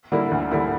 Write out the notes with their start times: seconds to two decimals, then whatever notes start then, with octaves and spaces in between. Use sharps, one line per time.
0.12 D3 G3 A#3 E4
0.32 D2
0.51 D3 G3 A#3 E4